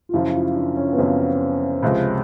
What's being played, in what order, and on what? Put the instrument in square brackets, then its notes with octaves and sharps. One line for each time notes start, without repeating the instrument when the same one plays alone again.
[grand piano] F4
[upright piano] F#2 C#3 F3 [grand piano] E4
[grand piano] F4
D4
C#4
B3
[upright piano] F#2 C#3 F3 [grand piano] C4
[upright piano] C#2 C3 F3 G#3